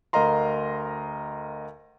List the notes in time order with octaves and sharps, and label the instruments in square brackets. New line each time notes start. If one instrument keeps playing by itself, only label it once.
[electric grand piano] D2 A#4 D#5 F5 A#5 C6